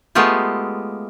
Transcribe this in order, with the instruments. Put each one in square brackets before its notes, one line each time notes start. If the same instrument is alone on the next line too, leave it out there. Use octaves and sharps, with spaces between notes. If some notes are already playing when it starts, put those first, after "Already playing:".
[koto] G#3 A3 B3 F4 G4